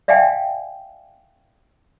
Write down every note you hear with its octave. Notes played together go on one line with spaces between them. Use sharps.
D5 E5 F5 G5 G#5